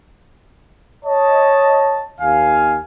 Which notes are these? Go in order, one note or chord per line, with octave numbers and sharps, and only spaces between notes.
C#5 D#5 A5
D#2 F5 G#5